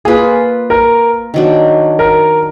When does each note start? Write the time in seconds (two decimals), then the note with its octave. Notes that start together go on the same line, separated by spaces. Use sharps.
0.05 A#3 F4 G#4 B4
0.70 A#4
1.34 D#3 F#3 D4
1.99 A#4